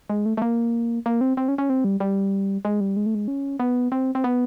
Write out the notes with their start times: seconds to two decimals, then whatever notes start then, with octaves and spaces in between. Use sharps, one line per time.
0.10 G#3
0.26 A3
0.37 A3
0.42 A#3
1.06 A#3
1.21 C4
1.37 C4
1.48 C#4
1.58 C#4
1.70 C4
1.84 G3
2.00 G3
2.65 G#3
2.80 G3
2.96 G#3
3.06 A3
3.15 G#3
3.28 C#4
3.60 B3
3.92 C4
4.15 C4
4.24 B3